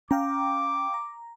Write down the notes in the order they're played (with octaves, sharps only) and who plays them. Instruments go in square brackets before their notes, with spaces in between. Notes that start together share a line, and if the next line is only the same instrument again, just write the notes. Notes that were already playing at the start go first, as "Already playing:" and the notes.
[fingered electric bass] C#4 [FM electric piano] F5 G5 A#5 [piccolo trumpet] D6
[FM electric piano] A#5